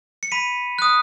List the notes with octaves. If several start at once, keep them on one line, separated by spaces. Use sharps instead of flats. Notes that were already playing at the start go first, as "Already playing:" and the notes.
C#7
B5 B6 D#7
D#6 F#6